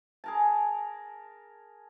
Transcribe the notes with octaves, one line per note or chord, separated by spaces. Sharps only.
G#4 A#4 A5